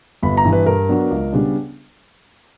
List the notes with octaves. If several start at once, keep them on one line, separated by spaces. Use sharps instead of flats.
G1 B5
A#5
G2 E3
B4
G2 A#4
F#3 B3 D4
C#2
C#3 G3 B3 D4